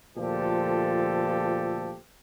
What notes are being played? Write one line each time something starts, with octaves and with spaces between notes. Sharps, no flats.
D2 A#2 F3 F4 G4 A4